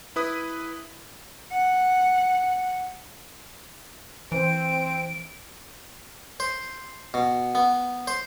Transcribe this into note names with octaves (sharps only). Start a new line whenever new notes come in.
E4 B4 D#6
F#5
E3 C4 C5 D7
C5
B2
B3
C5